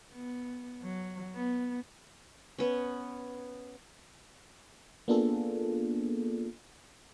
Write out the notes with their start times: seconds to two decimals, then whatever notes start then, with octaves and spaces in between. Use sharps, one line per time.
0.13 B3
0.82 F#3
1.35 B3
2.58 B3 C#4
5.08 A#3 B3 D4 F4 G#4 A4